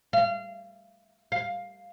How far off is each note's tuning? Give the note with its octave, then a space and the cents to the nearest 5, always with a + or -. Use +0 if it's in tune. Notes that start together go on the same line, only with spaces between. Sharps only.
F5 -25
F5 +10